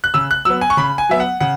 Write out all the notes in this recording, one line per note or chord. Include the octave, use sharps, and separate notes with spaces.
F#6
C#3 E6
F#6
F#3 B3 E6
G#5
C#6
C#3 B5
G#5
F#3 B3 E5
F#5
C#3 F#5